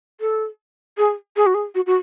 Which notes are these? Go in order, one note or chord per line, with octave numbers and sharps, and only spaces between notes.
A4
G#4
G#4
F#4
G#4
F#4
F#4